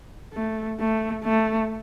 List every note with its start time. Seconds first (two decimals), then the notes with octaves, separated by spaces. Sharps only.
0.34 A3
0.80 A3
1.24 A3